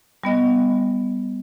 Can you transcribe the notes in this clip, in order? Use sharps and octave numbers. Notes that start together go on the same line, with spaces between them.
G3 B3 D#5